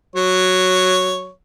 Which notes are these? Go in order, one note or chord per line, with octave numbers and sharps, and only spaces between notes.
F#3 C#5